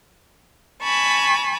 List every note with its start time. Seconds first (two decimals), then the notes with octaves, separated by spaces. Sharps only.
0.82 G#5 A5 B5 C#6